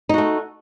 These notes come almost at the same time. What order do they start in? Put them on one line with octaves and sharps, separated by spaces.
D#4 F#4 A3